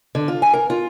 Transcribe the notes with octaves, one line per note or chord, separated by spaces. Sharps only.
D3
F4
G#5
A#4
F4